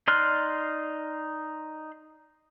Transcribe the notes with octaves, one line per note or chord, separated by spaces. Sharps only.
D#4 D5 C6 F6 F#6